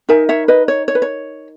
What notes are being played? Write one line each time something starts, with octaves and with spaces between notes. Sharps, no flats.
D#4 A#4 E5 G#5
C#5 E5
B4 D#5
C#5
C#5
B4
C#5